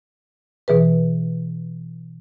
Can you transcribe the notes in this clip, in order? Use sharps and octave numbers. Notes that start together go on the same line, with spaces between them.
B2 E3 G#4 B4